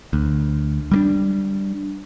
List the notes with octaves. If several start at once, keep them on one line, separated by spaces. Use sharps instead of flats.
D2
G3 G#3 D4